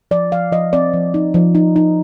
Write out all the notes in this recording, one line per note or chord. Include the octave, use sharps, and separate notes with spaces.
F3 D5
F3 F5
F3 D#5
C4 D5
F3
D#4
F3
D#4
D#4